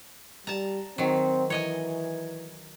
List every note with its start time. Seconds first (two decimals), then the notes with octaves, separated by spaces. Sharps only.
0.47 G3 A5 A#5
0.98 D#3 F#3 C4
1.50 E3 C#5 D#5 G#5